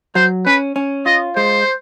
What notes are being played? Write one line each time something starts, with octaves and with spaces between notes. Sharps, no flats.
F#3 C5
C#4 B4
C#4
F4 D#5
G#3 C5